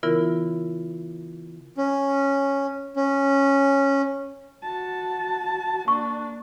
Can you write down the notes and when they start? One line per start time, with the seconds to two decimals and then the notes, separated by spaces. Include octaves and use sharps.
0.03 C#3 E3 B3 E4 F4 A#4
1.78 C#4
2.96 C#4
4.62 F#4 A5
5.88 A#3 D4 C#6